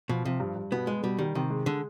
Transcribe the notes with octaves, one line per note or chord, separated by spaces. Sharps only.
B2 F3
C3 F3
G2
G2
B2 B3
G#3 B3
B2 G3
D#3 G3
C3 D#3
G#3
D3 G#3